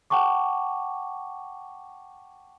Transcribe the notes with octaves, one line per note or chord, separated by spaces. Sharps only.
F#5 G5 A5 C#6 D6